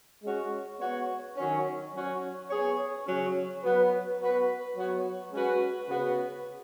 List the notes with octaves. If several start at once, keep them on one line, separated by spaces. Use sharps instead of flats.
G#3 C#4 F#4
B3 F#4 C#5
D#3 F#3 C#4
F#3 C#4 F#4 C#5
B3 G#4 C#5
C#3 F#3 C#4
F#3 B3 F#4 B4
B3 F#4 B4
F#3 B3 F#4 C#5
G#3 C#4 F#4 B4
C#3 B3 F#4 B4